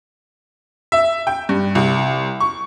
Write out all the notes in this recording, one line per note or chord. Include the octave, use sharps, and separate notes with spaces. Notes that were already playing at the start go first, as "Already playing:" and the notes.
E5
G5
G2
C2
C#6